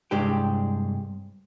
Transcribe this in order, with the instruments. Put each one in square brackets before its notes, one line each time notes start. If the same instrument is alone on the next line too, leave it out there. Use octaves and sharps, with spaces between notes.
[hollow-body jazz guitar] C2 G2 G#3 D4 G4 G5